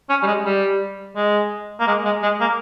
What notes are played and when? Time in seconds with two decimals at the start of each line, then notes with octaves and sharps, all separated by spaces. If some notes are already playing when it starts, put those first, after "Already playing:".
0.09 C#4
0.23 G3
0.26 G#3
0.45 G3
1.16 G#3
1.80 A#3
1.87 G#3
2.05 G#3
2.22 G#3
2.40 A#3